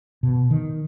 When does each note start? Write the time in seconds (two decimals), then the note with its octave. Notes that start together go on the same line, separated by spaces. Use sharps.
0.23 B2
0.51 D#3